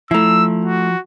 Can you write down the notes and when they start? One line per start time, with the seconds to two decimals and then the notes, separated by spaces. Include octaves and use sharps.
0.11 F3 A3 E4 A#5 E6
0.65 F#4